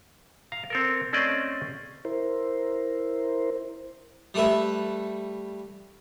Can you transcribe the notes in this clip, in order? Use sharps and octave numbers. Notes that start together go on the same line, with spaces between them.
F5 A#5
C4 A4 A#4
A3 C4 C#4 C5 D5 D#5
E4 A#4 C5
G3 A3 A4 B4 E5